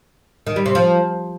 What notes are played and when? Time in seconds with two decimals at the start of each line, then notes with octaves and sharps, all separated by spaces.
0.47 D#3
0.56 G3
0.66 C3
0.75 F3